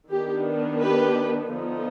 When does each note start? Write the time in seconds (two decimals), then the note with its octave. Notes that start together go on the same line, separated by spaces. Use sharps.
0.11 D#3 B3 D4 G4
0.82 G4 B4
1.52 D3 F3 B3 D#4